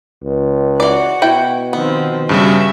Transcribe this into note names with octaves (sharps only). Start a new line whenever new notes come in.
C#2
E3 F#4 D5 F#5
B2 E4 G5
D#3 F3 B3 C4
G2 C#3 G3 F#4 E5 G#5